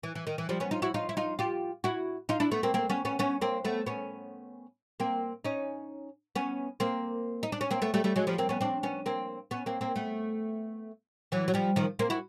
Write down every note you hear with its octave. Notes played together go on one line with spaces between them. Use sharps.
E3
E3
D#3
E3
F3 G3
B3 C#4
D#4 F4
E4 F#4
D#4 F4
E4
D#4 F4
F4 G4
E4 F#4
D#4 F4
D4 E4
A3 B3
A#3 C4
A#3 C4
B3 C#4
B3 C#4
B3 C#4
A#3 C4
A3 B3
B3 C#4
A#3 C4
C#4 D#4
B3 C#4
A#3 C4
D#4
D4
C#4
A#3 C4
A3 B3
G3 A3
G3 A3
F#3 G#3
F3 G3
A#3 C4
B3 C#4
C4 D4
B3 C#4
A#3 C4
B3 C#4
A#3 C4
A#3 C4
A3 B3
E3 F#3
F#3
F3 G3
D#3 F3
A#3 C4
E4 F#4